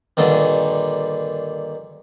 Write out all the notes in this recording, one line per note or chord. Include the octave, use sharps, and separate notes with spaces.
G2 A#2 D3 D#3